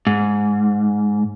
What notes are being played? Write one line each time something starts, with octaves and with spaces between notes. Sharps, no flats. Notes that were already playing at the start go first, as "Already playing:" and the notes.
G#2